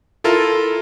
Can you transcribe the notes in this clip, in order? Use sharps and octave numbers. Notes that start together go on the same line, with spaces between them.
E4 F4 A4 A#4